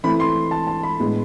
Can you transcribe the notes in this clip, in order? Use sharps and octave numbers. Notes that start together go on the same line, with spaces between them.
E3 A3 C4 B5
C6
A5
A5
B5
A2 G#3 B3 D4